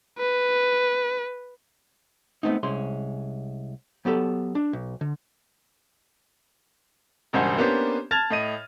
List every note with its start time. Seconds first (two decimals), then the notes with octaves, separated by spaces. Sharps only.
0.18 B4
2.43 G#3 A3 B3 C4 D#4
2.63 C2 G#3 C#4 C6
4.05 F#3 B3 G4 A4
4.55 D4
4.73 B1
5.01 D3
7.33 E1 C#2 G2 C5 F#5 G#5
7.58 A#3 B3 C#4 D4 G4 C5
8.11 A5 F6 G#6 A6 F7
8.30 A2 D#5 D#7